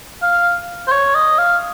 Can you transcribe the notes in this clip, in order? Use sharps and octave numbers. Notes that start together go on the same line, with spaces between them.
F5
C5
C#5
D#5
F5